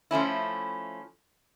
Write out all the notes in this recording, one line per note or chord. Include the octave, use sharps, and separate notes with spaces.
F3 A3 C#4 E4